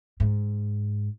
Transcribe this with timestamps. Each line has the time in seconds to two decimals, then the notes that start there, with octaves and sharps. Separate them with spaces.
0.20 G#2